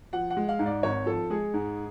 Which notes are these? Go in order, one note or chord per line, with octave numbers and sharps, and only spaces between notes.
F3 F#5
F#5
G#3
F5
G#2
D5
G#1 C#5
F3 A4
G#3 G#4
G#2